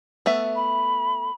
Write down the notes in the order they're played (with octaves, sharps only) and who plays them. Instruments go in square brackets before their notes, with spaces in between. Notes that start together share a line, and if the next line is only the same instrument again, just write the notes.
[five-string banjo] A3 B3 E5
[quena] B5